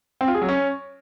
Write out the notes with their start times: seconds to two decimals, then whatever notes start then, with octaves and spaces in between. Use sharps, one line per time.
0.21 C4
0.28 F4
0.35 G#4
0.42 F#3
0.49 C#4